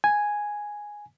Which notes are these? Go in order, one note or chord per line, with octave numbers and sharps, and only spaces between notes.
G#5